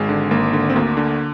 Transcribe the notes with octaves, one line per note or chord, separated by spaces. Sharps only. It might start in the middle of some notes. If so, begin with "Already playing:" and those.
Already playing: G#1 G#3
D3
G#1 A#3
D3
C4
D2 A#3
D3